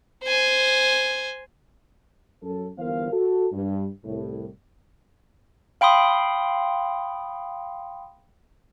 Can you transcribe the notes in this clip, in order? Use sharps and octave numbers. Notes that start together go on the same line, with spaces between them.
C5 G#5
F#2 A4
G1 E3 B3 A#4 C5 F5
F#4 A4
G2
C2 A2
F5 G5 B5 C6 D#6